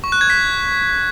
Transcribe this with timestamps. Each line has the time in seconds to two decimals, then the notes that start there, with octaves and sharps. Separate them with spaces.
0.04 C#6
0.12 F#6
0.21 G#6
0.30 B6